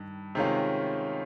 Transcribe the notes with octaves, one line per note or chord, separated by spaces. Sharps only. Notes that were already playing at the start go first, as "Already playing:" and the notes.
Already playing: G2 D#3
C3 D#3 G#3 C#4 F4